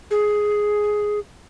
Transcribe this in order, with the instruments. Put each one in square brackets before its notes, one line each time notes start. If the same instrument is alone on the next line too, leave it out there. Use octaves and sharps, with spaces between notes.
[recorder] G#4